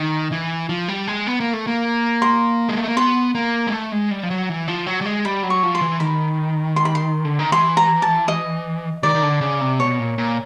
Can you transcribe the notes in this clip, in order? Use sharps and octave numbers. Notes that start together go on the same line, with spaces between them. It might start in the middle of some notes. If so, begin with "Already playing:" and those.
Already playing: D#3
E3
F3
G3
G#3
B3
A#3
A3
A#3
C6
G#3
A3
A#3
B3 C6
A#3
G#3
A3
G#3
G3
F3
F#3
E3
F3
F#3
G3
G#3
G3 B5
F#3
C#6
F3
C6
E3
D#3 B5
C6
B5
C6
D3
D#3
E3 C6
A#5
A5
D#5
D#3 D5
D#3
D3
C#3
C3
B2 C#5
A#2
A#2